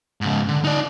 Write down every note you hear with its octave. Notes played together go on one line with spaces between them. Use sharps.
G#2 C#3
D3
D#4 D5